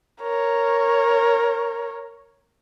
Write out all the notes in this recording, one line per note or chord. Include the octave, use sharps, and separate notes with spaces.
A#4 C#5